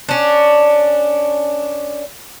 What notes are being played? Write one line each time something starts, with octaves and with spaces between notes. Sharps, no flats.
C#4 D4